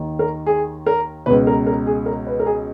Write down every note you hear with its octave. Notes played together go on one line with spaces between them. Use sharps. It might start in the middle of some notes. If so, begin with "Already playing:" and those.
Already playing: D#2 D#3
A#4
G#4
A#4
C#2 B2 B4
A#4
A#4
G#4
A#4
B4
A#4
G#4